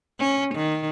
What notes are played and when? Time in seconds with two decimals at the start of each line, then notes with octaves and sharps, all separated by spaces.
0.19 C#4
0.55 D#3